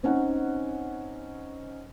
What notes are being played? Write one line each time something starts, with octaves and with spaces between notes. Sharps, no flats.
C4 C#4 D#4 F#5